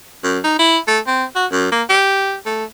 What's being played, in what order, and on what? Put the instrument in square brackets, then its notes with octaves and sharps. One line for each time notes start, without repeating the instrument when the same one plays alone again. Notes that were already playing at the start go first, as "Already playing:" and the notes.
[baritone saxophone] F#2
D#4
E4
A3
C4
F#4
F#2
A#3
G4
A3